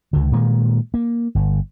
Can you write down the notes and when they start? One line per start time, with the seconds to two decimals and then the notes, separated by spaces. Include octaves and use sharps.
0.13 C#2 D3
0.32 A#2 D#3 E3 G#3
0.94 A#3
1.35 G1